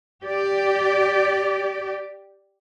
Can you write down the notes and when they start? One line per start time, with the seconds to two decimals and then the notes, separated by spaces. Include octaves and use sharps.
0.22 G4 D5